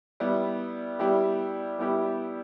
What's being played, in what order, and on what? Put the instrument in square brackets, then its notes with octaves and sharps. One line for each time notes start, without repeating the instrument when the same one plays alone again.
[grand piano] G3 B3 E4 G4
G3 B3 E4 G4
G3 B3 E4 G4